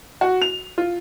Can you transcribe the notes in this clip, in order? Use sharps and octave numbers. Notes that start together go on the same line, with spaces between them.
F#4
F7
F4